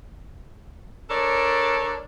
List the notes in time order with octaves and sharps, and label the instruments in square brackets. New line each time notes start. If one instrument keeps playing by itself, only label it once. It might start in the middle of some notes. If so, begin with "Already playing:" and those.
[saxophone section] D4 A4 A#4 C#5 D5